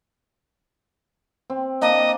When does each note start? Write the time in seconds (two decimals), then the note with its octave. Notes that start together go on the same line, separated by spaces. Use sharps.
1.50 C4
1.82 A#3 D4 D#5